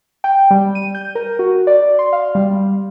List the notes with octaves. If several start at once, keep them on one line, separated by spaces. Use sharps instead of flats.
G5
G3
D#7
G6
A#4
F#4
D5
C6
F5
G3